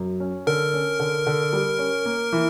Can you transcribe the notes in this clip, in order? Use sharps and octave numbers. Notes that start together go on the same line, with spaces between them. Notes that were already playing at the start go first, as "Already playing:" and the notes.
Already playing: F#2
C#4
D3 A#4
C#4
D3
D3
G3
C#4
A#3
E3